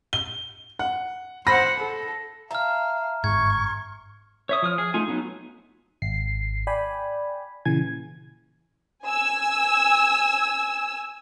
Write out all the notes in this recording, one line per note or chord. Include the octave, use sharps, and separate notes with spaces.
G7
F#5
C5 F#5 B5 A#6
A4
E5 F5 A5 A#5 F6
G1 G#2 C#6 G#6
C#5 E5 D#6
F3 D#6 F6
G#4
A3 D#4 F4 G#5
F#3 B3 D#4
G#1 C7
D5 G5 G#5 B5
A#2 C#3 E3 G#5 G#6
G#5 E6